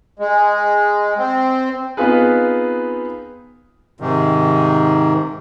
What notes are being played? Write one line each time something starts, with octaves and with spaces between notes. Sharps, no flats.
G#3
C4
B3 C4 D#4 F4 G#4 B4
G#2 C3 D#3